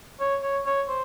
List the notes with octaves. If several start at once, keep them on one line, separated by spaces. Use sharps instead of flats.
C#5
C#5
C#5
C5